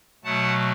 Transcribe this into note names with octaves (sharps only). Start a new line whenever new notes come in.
B2 F#3 A3 F#5 A5